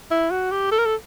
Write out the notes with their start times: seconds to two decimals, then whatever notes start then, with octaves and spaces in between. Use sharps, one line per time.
0.11 E4
0.31 F#4
0.51 G4
0.72 A4
0.78 A#4
0.86 A4